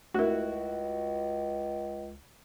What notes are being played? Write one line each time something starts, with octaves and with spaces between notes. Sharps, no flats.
C#2 A3 E4 F#4 A#4